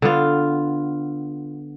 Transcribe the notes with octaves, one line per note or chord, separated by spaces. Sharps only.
D3 B3 F4